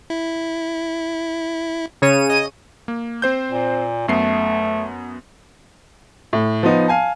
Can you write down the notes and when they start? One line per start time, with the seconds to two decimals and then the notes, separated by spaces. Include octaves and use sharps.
0.10 E4
2.02 C#3 C#5 D#7
2.30 D#5
2.88 A#3
3.22 C4 C5 G6
3.52 A#2
4.08 F#2 A3 B3 C7
6.33 A2
6.63 F3 B3 D#4
6.88 F5 G#5 A5